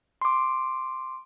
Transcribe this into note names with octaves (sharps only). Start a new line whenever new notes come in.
C6 D6